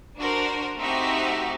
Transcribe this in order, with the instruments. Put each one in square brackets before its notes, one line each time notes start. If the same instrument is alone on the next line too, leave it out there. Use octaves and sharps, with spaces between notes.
[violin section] D4 F#4 A#4 C5
A3 C4 D#4 F#4 G4 E5